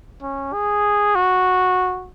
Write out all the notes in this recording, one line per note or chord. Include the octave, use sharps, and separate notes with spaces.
C#4
G#4
F#4